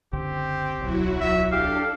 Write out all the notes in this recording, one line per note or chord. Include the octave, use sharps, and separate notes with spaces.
F#1 C#2 D3 C4 G4
D1 B1 F#3 E4 F#4
E5
D4 G4 A4 F5